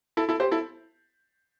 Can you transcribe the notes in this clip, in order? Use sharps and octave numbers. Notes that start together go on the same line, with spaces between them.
E4 A4
E4 A4
G4 C5
E4 A4